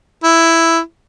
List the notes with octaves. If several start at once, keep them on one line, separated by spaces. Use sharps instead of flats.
E4